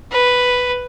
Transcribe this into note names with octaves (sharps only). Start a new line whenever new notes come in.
B4